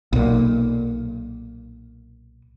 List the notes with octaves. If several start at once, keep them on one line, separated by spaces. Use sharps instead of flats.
B1 A#2